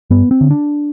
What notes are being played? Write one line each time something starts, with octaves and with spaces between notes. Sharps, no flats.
G2 B3
C4
D3
D4